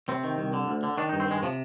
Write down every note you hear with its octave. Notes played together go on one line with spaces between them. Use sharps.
C3 C4
D#3
C2
D3
D2
D3
D#3 D4
D#4
G2
C4
D#3 G#3
C3 F3